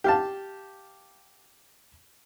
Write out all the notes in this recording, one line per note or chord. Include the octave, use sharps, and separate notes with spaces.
G4 F5 A5